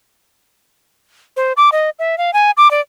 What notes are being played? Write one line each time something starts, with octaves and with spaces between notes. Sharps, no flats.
C5
D6
D#5
E5
F5
G#5
D6
D5